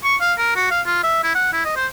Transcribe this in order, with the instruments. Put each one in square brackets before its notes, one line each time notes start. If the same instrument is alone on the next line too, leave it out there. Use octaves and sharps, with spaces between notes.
[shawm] C#6
F5
A#4
F#4
F5
F4
E5
E4
F#5
E4
D#5
C5